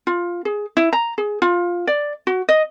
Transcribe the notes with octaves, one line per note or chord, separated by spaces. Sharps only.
F4
G#4
E4
A#5
G#4
F4
D5
F#4
D#5